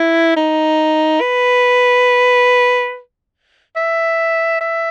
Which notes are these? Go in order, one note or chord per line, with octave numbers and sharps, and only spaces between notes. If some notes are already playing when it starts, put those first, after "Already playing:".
Already playing: E4
D#4
B4
E5
E5